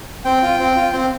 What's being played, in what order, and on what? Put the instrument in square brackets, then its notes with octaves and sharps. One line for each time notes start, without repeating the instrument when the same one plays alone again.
[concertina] C4 G5
F4
C4
F4
C4